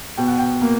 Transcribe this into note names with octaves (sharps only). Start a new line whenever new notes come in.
B2 G5
F#5
G5
A#3